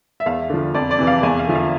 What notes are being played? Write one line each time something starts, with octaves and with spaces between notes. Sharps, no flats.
E5
E2 F5
D3 F3
F2 D5
D5
C3 E3
F5
E2 G#5
F5
D3 F3 E5
F5